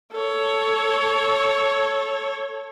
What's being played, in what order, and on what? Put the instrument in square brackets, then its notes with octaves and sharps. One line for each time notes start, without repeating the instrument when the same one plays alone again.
[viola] A4 C#5